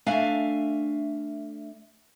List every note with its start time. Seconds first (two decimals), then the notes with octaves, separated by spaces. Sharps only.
0.06 A3 D4 E5 F5 G#5